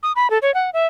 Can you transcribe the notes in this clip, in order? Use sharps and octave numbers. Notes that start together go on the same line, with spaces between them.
D#6
B5
A4
C#5
F#5
E5